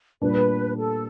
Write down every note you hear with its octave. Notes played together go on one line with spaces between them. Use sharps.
A#2 G3 B3 D4 B4
A4